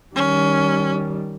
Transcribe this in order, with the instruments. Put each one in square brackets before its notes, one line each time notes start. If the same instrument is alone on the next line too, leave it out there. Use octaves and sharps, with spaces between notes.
[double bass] D#3 G3 [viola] C#4